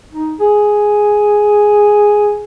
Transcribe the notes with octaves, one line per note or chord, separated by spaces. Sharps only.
D#4
G#4